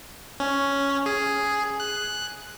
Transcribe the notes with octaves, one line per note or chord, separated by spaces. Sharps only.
C#4
G#4
F#6